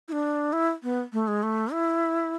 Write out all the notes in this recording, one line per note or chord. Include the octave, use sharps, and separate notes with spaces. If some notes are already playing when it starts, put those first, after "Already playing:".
E4
D4
E4
B3
A3
G#3
A3
E4